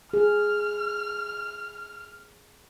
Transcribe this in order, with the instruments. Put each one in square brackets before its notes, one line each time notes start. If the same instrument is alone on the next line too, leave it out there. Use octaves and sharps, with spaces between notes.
[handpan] G#4 [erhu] F6